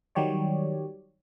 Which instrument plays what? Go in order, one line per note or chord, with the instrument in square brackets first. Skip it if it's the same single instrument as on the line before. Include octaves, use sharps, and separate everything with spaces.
[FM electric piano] D#3 F#3 G3 G4 C#5 D5